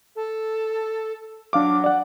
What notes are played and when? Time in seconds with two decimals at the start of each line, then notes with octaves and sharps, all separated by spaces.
0.16 A4
1.53 F#3 D4 F5 D6
1.84 D5 F#5